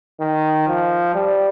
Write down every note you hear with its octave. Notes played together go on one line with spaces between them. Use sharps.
D#3
F3
G3